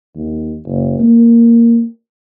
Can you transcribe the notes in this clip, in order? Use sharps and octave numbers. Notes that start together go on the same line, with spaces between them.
D#2
F#1
A#3